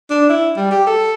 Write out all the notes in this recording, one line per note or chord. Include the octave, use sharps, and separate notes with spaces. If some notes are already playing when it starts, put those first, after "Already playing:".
D4
E4
G3
G4
A4